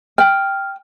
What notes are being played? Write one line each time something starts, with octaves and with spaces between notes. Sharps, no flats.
G5 F6